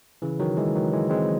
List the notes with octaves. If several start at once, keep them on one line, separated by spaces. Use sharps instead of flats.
C#3 E3
D#3 F#3
E3 G#3
D#3 F#3
E3 G#3
G#3 C4